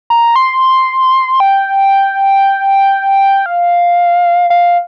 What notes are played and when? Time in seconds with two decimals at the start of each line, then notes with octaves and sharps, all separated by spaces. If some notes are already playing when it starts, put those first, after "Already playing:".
0.10 A#5
0.36 C6
1.40 G5
3.46 F5
4.50 F5